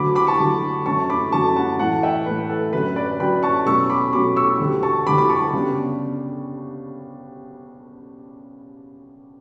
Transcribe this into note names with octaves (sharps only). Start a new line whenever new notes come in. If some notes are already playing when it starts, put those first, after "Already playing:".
Already playing: D2 D3 F#3 B5 D6
B5 D6
A5 C#6
D2 D3 F#3
F#2 D3 F#3 A3 C#4 A5 C#6
B5 D6
F#2 D3 F#3 A3 C#4 A5 C#6
F#5 A5
A2 E3 A3 F#5 A5
E5 G5
A2 E3 A3 B4
A4
F#2 D3 F#3 C#4 B4
B4 D5
F#2 D3 F#3 C#4 G5 B5
A5 C#6
B2 F#3 A3 C#4 C#6 E6
B5 D6
B2 F#3 A3 C#4 B5 D6
C#6 E6
D2 D3 G3
A5 C#6
D2 D3 G3 B5 D6
B5 D6
A5 C#6
C#3 G3 B3 D4